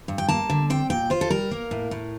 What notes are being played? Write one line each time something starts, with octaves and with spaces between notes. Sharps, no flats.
G2
G5
A#3 A5
D3
C4 G5
A#2 G5
F4 C5
A4
G3 A#4
A#3
A2
A2